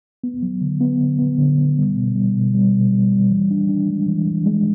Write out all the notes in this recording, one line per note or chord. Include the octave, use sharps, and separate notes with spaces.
B3
F#3
D3
B3
D3
B3
D3
B3
G3
B2
G3
B2
G3
B2
G3
G3
E3
D4
D4
G#3
E3
E3
G#3